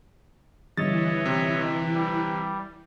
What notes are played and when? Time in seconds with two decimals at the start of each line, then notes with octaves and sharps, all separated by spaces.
0.77 G1 E3 C#5 D#5 E5 A6
1.25 C3
1.94 G3